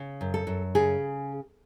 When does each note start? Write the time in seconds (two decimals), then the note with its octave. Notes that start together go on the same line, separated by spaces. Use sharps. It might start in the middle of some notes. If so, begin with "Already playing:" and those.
Already playing: C#3
0.21 F#2
0.34 A4
0.47 F#2
0.75 C#3 G#4